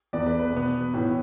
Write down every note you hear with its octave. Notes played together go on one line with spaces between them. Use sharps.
E2 E3 B3 D5
B4
B4
B2 B3
A2 E3 B3